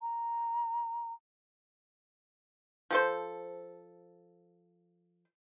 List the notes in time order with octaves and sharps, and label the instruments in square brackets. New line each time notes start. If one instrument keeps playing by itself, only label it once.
[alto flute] A#5
[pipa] F3 A4 C5